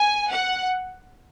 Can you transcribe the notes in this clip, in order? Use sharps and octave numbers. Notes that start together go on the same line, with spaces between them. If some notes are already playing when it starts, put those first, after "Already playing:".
Already playing: G#5
F#5